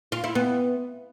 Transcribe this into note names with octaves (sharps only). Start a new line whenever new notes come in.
F4
E4
B3